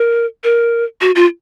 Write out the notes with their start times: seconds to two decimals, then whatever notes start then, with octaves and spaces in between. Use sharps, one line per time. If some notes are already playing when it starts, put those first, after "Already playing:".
Already playing: A#4
0.44 A#4
1.01 F#4
1.15 F4